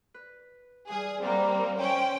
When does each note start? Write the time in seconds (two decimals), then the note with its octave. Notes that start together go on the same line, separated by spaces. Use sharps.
0.14 B4
0.89 E3 G3 G#4 F6
1.22 G3 A#3 C4 D5 F#5
1.78 C#4 C5 G5